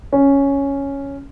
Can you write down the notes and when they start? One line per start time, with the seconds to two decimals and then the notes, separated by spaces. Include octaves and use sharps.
0.12 C#4